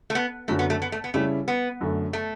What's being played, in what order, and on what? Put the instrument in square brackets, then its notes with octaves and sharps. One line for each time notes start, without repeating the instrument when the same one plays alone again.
[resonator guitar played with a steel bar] A3
B3
[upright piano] F#2 D3 F#3 [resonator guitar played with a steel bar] A3
[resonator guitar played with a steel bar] B3
A3
B3
A3
B3
[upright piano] C#3 G3 C#4 E4 G4 [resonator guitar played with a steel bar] A3
[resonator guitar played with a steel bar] B3
[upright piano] F#2 D3 A3
[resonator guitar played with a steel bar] A3